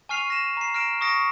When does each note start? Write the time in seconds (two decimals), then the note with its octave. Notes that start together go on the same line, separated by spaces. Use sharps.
0.09 G#5 C#6 F6 C7 D#7 F7
0.30 A#6 E7
0.57 A#5 C7
0.74 F6 A#6 D7 E7
1.01 C#6 D#6 A#6 C#7 D7